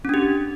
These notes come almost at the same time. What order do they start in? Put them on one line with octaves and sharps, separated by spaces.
C#4 D4 G4